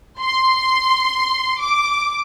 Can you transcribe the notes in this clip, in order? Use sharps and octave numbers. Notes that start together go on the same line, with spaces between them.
C6
D6